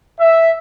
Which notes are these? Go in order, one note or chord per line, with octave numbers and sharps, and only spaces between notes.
E5